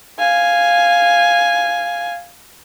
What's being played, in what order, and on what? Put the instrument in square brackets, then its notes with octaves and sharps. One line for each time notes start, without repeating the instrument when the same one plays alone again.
[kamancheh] F5 G#5